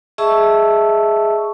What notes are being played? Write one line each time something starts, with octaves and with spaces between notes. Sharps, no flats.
G#4 D#5 E5 A5 C#6 E6